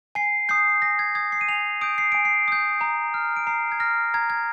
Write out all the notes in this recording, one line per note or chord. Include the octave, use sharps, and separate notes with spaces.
G#5 C7
D#6 G6 C7
G#5 A#6
G#6
D#6 G6 G#6
C7
D#7
G#5 F7
D#6 G6 D7
C7
G#5 D7
C7
D#6 G6
A#5
F6
D7
A#5 C7
G#6
F6 A#6
A#5 G#6
G#6